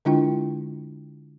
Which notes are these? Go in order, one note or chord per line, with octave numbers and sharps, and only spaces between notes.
D3 G#3 D4 E4 F4 G5